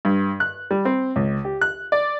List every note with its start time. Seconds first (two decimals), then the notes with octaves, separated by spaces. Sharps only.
0.05 G2
0.40 F#6
0.71 G3
0.85 C4
1.16 C#2
1.45 G4
1.61 F#6
1.92 D5